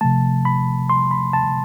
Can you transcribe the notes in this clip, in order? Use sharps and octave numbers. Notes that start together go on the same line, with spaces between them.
C3 F3 A3 A5
B5
C6
B5
A5